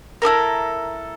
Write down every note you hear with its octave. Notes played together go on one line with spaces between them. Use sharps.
E4 G4 A4 A#4